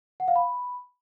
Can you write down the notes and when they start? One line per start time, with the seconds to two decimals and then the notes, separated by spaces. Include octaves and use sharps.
0.20 F#5
0.28 F5
0.36 B5